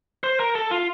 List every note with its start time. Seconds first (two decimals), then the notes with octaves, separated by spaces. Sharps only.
0.24 C5
0.40 A#4
0.55 A4
0.71 F4